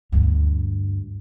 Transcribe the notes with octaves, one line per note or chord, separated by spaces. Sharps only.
D2 G2